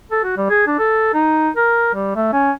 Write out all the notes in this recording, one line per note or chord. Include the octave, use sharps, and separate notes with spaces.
A4
F#4
G3
G#4
D4
A4
D#4
A#4
G3
A3
C#4